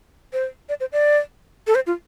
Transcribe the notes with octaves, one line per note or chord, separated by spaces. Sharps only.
C5
D5
C5
D5
A4
C5
F4